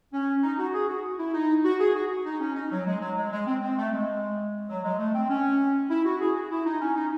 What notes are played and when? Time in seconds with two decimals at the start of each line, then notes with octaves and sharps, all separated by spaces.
0.13 C#4
0.43 D#4
0.59 F#4
0.74 G#4
0.89 F#4
1.19 E4
1.34 D#4
1.64 F#4
1.80 G#4
1.95 F#4
2.26 D#4
2.41 C#4
2.56 D#4
2.71 F#3
2.86 G#3
3.01 F#3
3.17 G#3
3.32 G#3
3.47 C4
3.62 C4
3.77 A3
3.93 G#3
4.69 F#3
4.84 G#3
4.99 A3
5.14 C4
5.29 C#4
5.90 E4
6.05 F#4
6.20 G#4
6.36 F#4
6.51 E4
6.66 D#4
6.81 C#4
6.97 D#4